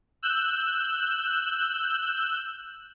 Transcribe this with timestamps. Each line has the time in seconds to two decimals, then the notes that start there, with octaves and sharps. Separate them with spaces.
0.23 E6 F#6 G6